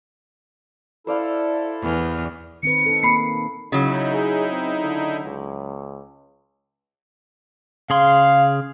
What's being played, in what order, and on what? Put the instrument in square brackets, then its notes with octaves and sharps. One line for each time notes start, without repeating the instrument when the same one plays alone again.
[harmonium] E4 A4 [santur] C5 D5 F5
[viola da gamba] E2
[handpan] D#3 C4 B4 [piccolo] C#7
[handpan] D#4 A4
[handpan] A#3 [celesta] B5 C7
[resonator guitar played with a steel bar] C#3 F#3 [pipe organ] D#4 E4
[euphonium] G#4
C4
D3
C#2
[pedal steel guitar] C#3 G#4 C6 [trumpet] F5